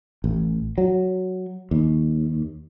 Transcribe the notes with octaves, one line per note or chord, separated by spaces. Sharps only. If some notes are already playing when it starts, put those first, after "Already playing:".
A1
F#3
D#2